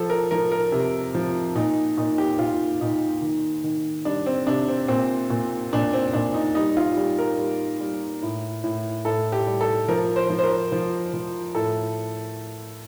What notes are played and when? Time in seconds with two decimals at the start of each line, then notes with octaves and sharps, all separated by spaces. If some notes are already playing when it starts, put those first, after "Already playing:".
Already playing: F3 A4
0.10 A#4
0.31 F3 A#4
0.52 A#4
0.72 C3
1.15 F3
1.55 A#2 D#4
1.97 A#2 D#4
2.18 G4
2.39 A#2 F4
2.81 A#2 D#4
3.22 D#3
3.64 D#3
4.05 G3 D4
4.26 C4
4.47 C3 D4
4.69 C4
4.88 A#2 C4
5.30 A#2
5.73 A#2 D4
5.93 C4
6.13 A#2 D4
6.34 D#4
6.55 G3 D#4
6.77 F4
6.97 G3 G4
7.18 A#4
7.38 G3
7.80 G3
8.22 A2
8.64 A2
9.05 A2 A4
9.32 G4
9.47 G3
9.61 A4
9.88 F3 A#4
10.16 C5
10.30 F3
10.39 C5
10.44 A#4
10.72 F3
11.14 F3
11.55 A2 A4